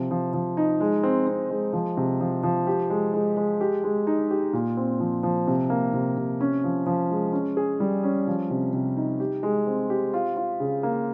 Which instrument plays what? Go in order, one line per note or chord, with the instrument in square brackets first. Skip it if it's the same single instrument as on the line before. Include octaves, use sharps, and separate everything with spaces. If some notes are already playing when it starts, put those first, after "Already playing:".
Already playing: [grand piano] C3 F3
F3
F3
D#4
G#3
C4
C4
G#3
F3
C3
F3
F3
G4
G#3
G#3
G#3
G4
G#3
D#4
G4
A#2
C4
F3
F3
C3
A#3
C3
C3
C#4
F3
F3
G#3
C#4
G#4
G3
C#4
F3
C3
C3
D#4
G4
G#3
C4
G4
F4
F4
C#3
A#3